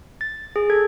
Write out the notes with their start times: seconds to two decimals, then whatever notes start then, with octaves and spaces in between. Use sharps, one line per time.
0.21 A6
0.56 G#4
0.70 A4 G#6